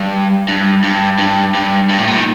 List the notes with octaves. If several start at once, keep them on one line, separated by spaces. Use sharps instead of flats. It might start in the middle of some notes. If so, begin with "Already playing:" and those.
Already playing: G2
G2
G2
G2
G2
G2
A2
A#2
D#3